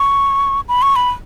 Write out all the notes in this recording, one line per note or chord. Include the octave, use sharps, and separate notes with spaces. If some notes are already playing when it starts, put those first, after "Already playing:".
Already playing: C#6
B5
C#6
B5